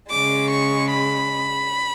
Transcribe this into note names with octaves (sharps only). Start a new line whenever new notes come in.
C#3 G#3 D6
C#6
B5